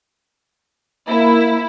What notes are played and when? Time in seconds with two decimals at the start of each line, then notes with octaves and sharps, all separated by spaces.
1.08 A#3 E4